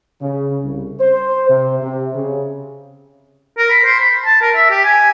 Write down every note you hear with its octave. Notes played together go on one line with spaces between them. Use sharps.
C#3
C2
C5
C3
C3
C#3
A#4
B5
C5
B5
A5
A#4
E5
G4
G#5